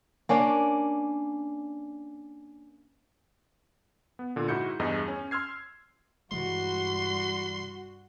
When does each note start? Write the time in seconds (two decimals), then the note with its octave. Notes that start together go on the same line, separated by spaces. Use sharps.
0.29 A#3 C#4 D4
4.19 B3
4.36 A#2 D3
4.48 G#2 E4 F#4 G6 C#7
4.80 E2 G2 G#4 D#5
5.08 C#4
5.31 C6 E6 F6 G#6 C7
6.31 G2 C3 E3 G3 G#3 F#4 C6